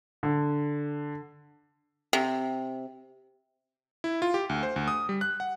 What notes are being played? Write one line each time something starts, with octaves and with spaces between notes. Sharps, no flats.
D3
C3
E4
F4
G4
D2
C5
D2
D#6
G3
F#6
F#5